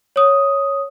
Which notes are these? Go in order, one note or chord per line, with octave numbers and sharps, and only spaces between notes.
C#5 D#6